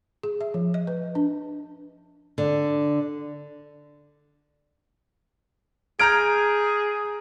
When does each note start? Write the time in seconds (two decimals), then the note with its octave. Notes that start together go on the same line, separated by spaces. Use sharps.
0.23 G#4
0.41 E5
0.54 F3
0.74 D#5
0.87 B4
1.15 D4
2.38 D3
6.00 G#4 A#5 F6 G6 G#6 D7